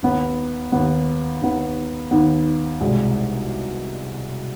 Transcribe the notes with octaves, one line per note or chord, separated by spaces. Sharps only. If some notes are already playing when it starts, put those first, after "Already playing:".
D#2 D#3 B3
D#2 D#3 B3
D#2 D#3 B3
D#2 D#3 B3
C2 B2 G#3 D4